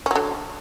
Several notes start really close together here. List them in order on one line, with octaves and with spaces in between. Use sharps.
C#4 F#3 D3